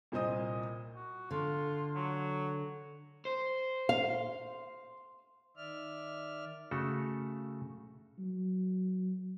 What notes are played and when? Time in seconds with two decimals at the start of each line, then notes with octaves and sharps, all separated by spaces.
0.12 C2 A#2 C5 D#5 D#6
0.96 F#4
1.31 D3 F4
1.95 F#3
3.25 C5
3.89 F5
5.57 D#3 D5 E5 F6
6.71 C#3 A3 F#4 A4
8.19 F#3